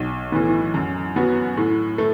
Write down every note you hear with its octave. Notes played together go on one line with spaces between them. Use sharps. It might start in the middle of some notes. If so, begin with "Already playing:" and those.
Already playing: B1
A2 E3 B3
F#2
F#3 B3 F#4
A2
A3